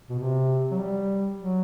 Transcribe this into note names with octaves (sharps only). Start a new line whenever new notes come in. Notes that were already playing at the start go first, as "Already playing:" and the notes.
B2
C3
F#3
G3
F#3